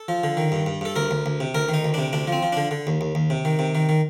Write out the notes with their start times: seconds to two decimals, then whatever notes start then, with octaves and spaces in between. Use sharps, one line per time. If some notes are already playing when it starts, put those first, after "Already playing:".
Already playing: A4
0.08 F3
0.24 D3
0.37 D#3
0.52 G2
0.66 G2
0.81 G2 A4
0.96 D2 A#4
1.11 D2
1.26 D2
1.40 C3
1.55 D2 A#4
1.69 D#3 D#4
1.84 D2
1.94 C3 D4
2.13 D2 D4
2.28 F3 C4
2.43 F3
2.53 D3 D4
2.71 D3
2.87 D#2
3.01 D#2
3.15 D#2
3.30 C3
3.45 D#3
3.59 C3
3.75 D#3
3.89 D#3